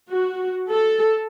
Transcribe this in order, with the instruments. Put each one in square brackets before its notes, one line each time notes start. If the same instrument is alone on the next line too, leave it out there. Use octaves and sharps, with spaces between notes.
[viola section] F#4
A4